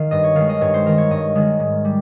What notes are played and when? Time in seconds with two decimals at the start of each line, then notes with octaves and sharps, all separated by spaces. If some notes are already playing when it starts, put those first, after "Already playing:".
Already playing: D#3 F5
0.11 G2 D#5
0.24 C#5
0.36 D#3 G#3 F5
0.49 D#5
0.61 G2 C#5
0.74 C5
0.86 D#3 G#3 A#4
0.98 C#5
1.10 G2 D#5
1.35 D#3 G#3
1.60 G#2
1.85 G3